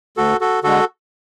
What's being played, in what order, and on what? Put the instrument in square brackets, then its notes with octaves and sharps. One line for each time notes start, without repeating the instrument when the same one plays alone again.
[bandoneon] D2 F#4 A4
F#4 A4
D3 G#3 F#4 A4